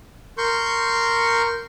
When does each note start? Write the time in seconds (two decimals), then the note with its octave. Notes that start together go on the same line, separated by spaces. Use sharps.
0.38 A#4 C6 C#6 G6